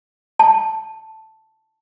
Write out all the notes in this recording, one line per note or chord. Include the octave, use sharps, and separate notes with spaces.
A5